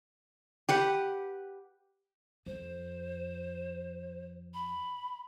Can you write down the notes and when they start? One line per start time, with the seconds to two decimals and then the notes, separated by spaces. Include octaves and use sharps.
0.69 G4 B4 F#5
2.46 F2 C5
4.54 B5